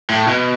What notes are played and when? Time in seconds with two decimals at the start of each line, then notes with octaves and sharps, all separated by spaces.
0.10 A2
0.27 B2